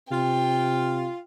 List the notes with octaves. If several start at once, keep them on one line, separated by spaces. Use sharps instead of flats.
C3 F4 G5